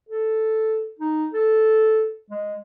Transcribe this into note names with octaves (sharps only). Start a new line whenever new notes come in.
A4
D#4
A4
G#3